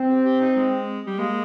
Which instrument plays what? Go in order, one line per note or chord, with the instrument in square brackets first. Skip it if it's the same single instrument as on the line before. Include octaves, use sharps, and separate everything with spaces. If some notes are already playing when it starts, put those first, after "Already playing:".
Already playing: [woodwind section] C4
[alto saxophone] G4
G4
D#4
G#3
G3
[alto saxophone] G#3 [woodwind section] A#3